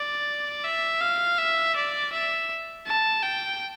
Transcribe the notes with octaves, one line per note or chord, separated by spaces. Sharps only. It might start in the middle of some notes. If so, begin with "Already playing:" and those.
Already playing: D5
E5
F5
E5
D5
E5
A5
G5